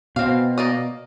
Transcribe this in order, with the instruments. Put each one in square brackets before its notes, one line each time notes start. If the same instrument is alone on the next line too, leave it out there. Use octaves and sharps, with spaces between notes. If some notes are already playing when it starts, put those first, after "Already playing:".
[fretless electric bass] B2 [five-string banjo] C4 F5
[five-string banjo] A#3 D5 D#5